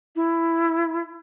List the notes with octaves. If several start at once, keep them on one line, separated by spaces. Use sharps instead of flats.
E4